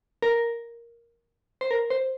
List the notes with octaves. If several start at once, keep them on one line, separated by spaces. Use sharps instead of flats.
A#4
C5
A#4
C5